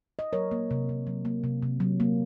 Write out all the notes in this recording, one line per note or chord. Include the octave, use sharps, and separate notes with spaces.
D#5
F#3 A#4 C#5
A#3
C3
C3
F#3
A#3
C3
C3
F#3
A#3